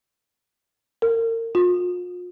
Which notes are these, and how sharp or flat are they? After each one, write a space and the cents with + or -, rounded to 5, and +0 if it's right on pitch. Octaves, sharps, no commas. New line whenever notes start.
A#4 -35
F4 +40